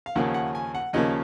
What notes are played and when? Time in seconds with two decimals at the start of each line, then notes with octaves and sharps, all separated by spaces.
0.06 F5
0.15 D#2 C#3 F3 A#3 C#4 F#5
0.34 F#5
0.55 G#5
0.75 F#5
0.93 D#2 C#3 F3 A#3 C#4 D#5